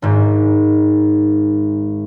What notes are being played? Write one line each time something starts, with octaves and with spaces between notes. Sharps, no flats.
G#1 G#2